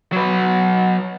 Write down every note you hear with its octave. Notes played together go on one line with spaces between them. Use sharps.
F#3 B4